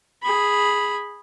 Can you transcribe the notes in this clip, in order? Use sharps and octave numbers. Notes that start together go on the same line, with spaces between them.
G#4 B5